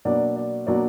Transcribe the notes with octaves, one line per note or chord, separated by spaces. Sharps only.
B2 F#3 A#3 D4 D5
D5
B2 F#3 A#3 D4 D5